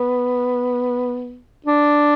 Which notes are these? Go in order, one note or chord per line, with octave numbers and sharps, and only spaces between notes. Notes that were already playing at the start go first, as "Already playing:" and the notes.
Already playing: B3
D4